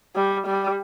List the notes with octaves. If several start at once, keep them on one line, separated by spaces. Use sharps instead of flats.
G3
G3